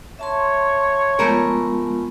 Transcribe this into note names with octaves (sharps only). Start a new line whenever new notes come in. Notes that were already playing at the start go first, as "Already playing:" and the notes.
C#5 E5 A5 C6
F3 G#3 A3 B3 F4 A#4